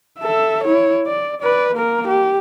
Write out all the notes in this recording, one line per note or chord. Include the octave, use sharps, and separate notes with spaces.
A4 E5
E4 C#5
D5
B4 D5
A#3 A#4
G4